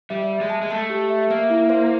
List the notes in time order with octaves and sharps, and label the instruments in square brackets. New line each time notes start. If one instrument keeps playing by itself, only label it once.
[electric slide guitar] G3 [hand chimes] E5
[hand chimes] E5
[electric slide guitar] G#3
[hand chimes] A5
[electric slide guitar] G#3
[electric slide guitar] A3 [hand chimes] A5
[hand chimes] G4
E5
[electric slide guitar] A#3 [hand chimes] E5
[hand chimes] E4
C5